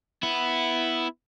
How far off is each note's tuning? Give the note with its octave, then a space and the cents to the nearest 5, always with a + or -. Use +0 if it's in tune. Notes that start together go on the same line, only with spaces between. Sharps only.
B3 +0 E4 +0